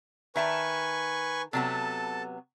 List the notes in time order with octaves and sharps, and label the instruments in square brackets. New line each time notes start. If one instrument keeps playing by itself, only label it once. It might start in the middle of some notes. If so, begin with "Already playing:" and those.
[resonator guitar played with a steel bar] D#3 E5 A5 [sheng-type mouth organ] B4 G#5 C#6
[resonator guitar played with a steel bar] C3 F#3 B3 [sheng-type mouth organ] A4 A5